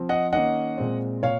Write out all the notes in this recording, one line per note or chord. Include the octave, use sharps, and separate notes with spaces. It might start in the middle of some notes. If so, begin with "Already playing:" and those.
Already playing: F3 C4
D#5 F#5
D#3 A#3 C#4 D#5 F#5
A#2 G#3 C4
A#2 C#5 F5